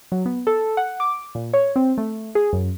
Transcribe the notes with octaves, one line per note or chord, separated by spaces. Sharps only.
F#3
B3
A4
F#5
D6
A#2
C#5
C4
A3
G#4
F#2